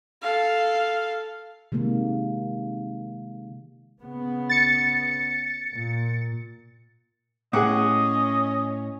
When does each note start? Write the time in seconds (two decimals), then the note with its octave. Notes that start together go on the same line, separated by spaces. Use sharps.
0.22 A4 F5
1.72 C3 D#3 G#3 A#3
4.01 C#3 B3
4.49 A6 C#7
5.72 A#2
7.53 A2 C#4 G#4 D#5 F#5 D6